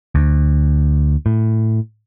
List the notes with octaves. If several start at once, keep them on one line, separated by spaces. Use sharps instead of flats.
D2
A2